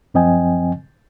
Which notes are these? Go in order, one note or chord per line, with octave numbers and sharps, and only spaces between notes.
F#2 F3 C4 D#5 G5 G#5